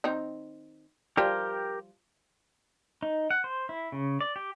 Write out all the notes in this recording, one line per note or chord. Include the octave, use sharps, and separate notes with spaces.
D#3 C4 D#4
F3 G3 G4 A#4 G5
D#4
F#5
C5
E4
C#3
D5
G4